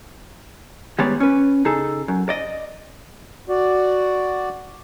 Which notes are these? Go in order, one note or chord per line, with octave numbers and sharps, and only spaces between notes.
D#3 G3 G#3 B3 C#5 D5
C#4 B4
C#3 D#4 G#4 A4
F#2
D5 D#5
F#4 D5